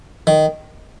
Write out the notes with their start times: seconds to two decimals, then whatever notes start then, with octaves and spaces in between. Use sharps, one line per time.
0.27 D#3